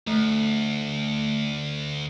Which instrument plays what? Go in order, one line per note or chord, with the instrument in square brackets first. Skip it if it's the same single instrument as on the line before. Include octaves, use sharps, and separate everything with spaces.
[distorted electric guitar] D2 [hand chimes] A3